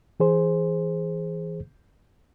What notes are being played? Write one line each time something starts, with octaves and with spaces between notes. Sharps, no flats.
E3 G#4 C5